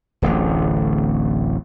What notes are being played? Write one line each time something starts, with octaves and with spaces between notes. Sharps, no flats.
D1 A1 D3